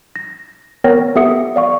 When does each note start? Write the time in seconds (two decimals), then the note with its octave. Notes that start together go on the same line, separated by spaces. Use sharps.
0.16 A#6
0.84 B3 A#4 C#5 G5 A#6
1.15 B3 G4 A4 E5 D#6 C#7
1.56 D5 F5 C#6